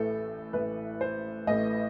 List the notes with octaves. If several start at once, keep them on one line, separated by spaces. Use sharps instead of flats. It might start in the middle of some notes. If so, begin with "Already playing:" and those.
Already playing: A1 A2 E3 A3 A4
A1 A2 E3 A3 B4
C5
A1 A2 E3 A3 D#5